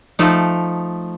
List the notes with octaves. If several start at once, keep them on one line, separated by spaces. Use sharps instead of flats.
F3 A3 D#4